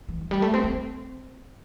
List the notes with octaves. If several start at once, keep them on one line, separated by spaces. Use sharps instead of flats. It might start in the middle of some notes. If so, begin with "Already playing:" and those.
E3
E3
G3
A3
C4
C4